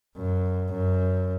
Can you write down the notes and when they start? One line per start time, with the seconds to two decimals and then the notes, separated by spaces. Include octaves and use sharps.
0.16 F#2
0.72 F#2